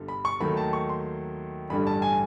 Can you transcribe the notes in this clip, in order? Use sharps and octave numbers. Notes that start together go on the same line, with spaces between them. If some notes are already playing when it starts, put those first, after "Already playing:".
Already playing: G1 D3 G3
B5
C#6
D#2 D#3 F#3 A3 B5
A5
C#6
C6
A1 G2 D3 G3 B5
A5
G#5